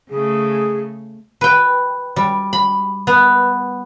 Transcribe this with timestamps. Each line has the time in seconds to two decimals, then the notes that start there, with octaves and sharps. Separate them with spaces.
0.10 C#3 A3 G#4
1.41 B4 G5
2.16 G3
2.53 B5
3.07 B3